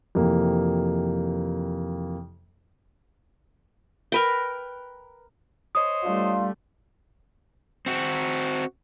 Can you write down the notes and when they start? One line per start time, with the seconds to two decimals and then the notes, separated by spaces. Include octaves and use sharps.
0.15 F2 C3 E3 A#3
4.12 A#4 B4 G5
5.75 C5 C#5 D#5 D#6
6.04 G3 A3 D4 F4
7.86 C4 F#4